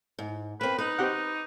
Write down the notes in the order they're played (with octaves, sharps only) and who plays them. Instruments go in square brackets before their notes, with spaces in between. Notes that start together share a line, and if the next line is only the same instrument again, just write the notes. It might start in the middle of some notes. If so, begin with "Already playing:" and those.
[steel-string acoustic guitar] G#2
[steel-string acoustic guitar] A#3 C4 [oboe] B4
[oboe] D#4 [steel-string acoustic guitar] B4
[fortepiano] C4 G4 F#5